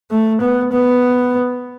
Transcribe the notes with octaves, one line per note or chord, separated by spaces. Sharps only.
A3
B3
B3